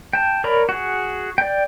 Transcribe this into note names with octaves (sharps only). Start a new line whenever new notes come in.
G5 A5
A#4 C#5 D5 A#5 B5
F#4 G#4
D5 G5